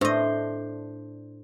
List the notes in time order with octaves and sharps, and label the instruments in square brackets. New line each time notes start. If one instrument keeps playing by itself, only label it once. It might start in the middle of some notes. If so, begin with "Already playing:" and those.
[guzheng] A2 D#5 [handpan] D4 C5